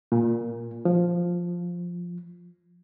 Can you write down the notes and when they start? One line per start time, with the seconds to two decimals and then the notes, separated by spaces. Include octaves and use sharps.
0.12 A#2
0.85 F3